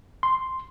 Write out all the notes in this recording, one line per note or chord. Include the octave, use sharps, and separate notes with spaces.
C6